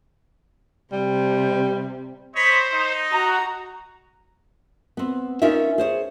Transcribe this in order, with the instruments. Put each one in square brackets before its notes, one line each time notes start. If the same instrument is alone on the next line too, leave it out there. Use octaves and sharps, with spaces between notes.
[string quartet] C3 [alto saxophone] G3
[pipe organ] C5 [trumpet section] C#5 D#5 B5
[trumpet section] D#4
[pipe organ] F#4 [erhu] A#5
[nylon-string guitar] B3 C4
C#4 D#4 F4 A#4 E5
G#4 C5 C#5